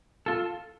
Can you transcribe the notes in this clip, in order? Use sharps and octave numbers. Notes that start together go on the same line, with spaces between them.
F4 A4